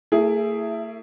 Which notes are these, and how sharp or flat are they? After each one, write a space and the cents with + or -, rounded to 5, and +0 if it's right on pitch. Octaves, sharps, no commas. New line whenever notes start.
A3 +40 E4 +15 G#4 +0